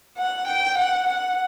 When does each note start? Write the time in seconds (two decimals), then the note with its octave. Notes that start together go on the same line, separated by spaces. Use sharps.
0.18 F#5
0.48 G5
0.78 F#5
1.09 F#5